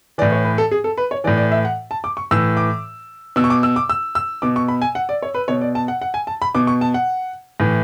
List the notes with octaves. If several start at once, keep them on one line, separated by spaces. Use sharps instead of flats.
A2 E3 D5
C#5
B4
A4
G#4
A4
B4
C#5
A2 E3 D5
D5
E5
F#5
A5
D6
C#6
A2 E3 E6
D6
B2 E6
C#6
D6
E6
D6
E6
E6
B2 D6
C#6
B5
G#5
F#5
D5
C#5
B4
B2 C#5
D5
A5
F#5
F#5
G#5
A5
B5
B2 D6
C#6
A5
F#5
A2 E3